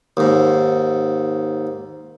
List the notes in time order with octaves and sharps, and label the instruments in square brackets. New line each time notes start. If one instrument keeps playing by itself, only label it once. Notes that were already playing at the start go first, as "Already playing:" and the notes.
[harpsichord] D#2 G#2